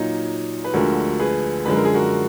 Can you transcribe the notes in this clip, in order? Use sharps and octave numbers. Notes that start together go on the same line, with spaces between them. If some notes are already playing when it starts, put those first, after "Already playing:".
Already playing: A#2 F#3 D#4
B4
D2 D3 F3 G#3 F#4 A#4
G#4 B4
F#2 D3 F3 G#3 B4
A#4
G#4
F#4 A#4